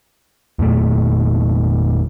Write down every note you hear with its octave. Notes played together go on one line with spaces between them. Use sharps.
E2 A#2 A3